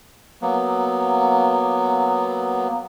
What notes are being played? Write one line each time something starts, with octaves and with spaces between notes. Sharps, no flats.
F#3 A#3 B3